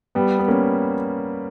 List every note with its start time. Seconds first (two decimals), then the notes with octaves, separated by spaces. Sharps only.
0.15 G3 B3
0.39 B3
0.48 A#3 C#4